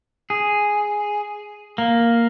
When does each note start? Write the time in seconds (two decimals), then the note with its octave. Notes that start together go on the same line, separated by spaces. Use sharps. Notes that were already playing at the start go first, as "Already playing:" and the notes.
0.30 G#4
1.78 A#3